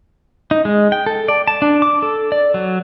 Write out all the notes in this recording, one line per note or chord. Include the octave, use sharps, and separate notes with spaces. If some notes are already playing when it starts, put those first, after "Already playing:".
D#4
G#3
G5
A4
D5
A5
D4
D6
A4
D5
F#3